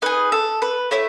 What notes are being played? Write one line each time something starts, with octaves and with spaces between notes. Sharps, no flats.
D#4 G#4 B4
A4
B4
A3 E4 C#5